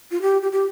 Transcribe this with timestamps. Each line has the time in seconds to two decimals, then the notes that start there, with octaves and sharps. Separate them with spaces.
0.11 F4
0.22 G4
0.42 G4
0.52 G4